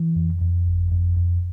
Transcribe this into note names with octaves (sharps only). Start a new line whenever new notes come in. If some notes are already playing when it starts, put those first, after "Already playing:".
Already playing: E3
F2
F2
G1
F2
F2